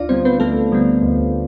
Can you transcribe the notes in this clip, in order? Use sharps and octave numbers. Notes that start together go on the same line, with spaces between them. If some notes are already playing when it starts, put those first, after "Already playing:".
Already playing: D2 D4 F4 D5 F5
D3 G3 B3 C4 C5
B3 B4
D2 A3 A4
D3 G3 B3
D2